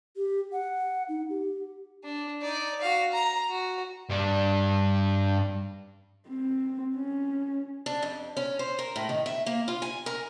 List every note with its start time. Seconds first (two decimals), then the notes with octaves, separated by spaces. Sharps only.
0.16 G4
0.52 F#5
1.09 D#4
1.30 G4
2.04 D4
2.42 D#4 D5
2.81 F#4 F5
3.12 A#5
3.49 F#4
4.10 G2 D4
6.28 C4
6.96 C#4
7.86 D4
8.03 F2
8.37 C#4
8.59 C5
8.79 A#4
8.96 A2
9.09 D#3
9.26 E5
9.46 A#3
9.68 F4
9.82 G#5
10.06 A#4